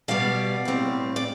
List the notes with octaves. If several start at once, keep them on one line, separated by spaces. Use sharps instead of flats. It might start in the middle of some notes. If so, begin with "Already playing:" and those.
B2 G3 B3 D5 F5
A2 G3 C4
D5